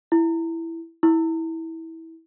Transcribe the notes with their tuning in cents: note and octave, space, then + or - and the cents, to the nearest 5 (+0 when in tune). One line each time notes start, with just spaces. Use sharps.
E4 +5
E4 -20